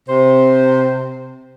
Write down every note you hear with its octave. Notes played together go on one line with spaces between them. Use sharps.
C3 C5